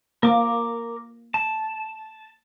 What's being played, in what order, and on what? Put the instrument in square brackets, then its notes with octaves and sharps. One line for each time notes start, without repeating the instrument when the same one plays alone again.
[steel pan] A#3 [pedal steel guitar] A#4 D6
[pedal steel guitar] A5